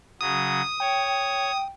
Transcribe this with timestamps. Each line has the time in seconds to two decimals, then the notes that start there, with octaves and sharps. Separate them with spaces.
0.21 C#3 F#3 D#6
0.80 C#5 G5